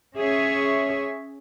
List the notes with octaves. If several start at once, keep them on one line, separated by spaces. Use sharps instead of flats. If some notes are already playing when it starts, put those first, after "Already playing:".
C#4 G#4 C#5 E5